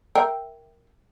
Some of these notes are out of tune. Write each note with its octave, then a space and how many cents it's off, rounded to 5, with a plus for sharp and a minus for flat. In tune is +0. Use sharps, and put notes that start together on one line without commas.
A#4 +0 E5 +0 G5 +0